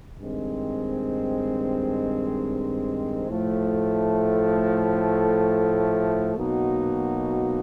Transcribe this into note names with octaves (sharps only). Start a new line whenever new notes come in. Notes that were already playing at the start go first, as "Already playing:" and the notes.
G2 D#3 G#3 C4
A2 F3 A3
B2 F#3 A#3 D#4 F#4